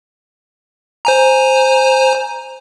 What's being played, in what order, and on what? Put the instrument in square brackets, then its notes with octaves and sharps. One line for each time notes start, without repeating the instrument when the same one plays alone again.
[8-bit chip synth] C5 G#5 A#5